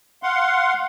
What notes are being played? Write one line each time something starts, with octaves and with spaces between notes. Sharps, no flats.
F5 F#5 C6